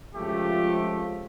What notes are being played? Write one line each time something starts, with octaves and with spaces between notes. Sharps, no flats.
C#2 C3 F3 A3 G4